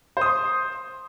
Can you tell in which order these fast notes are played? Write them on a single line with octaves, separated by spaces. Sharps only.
C5 D#6 C6